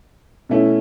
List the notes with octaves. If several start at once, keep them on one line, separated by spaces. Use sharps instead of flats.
B2 A3 C#4 E4